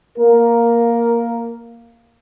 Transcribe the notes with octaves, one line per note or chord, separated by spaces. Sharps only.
A#3 A#4